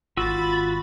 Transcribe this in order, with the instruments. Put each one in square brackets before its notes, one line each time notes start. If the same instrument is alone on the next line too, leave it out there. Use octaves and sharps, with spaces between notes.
[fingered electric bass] G#1 [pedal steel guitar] F4 F#4 E6 [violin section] B5 A6